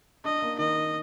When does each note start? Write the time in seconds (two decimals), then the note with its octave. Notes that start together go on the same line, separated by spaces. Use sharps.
0.25 D4 D#5
0.42 A#3
0.59 D#3 D#5
0.76 D#3